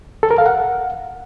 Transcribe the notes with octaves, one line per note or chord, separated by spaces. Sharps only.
A4
A#4
F5
F#5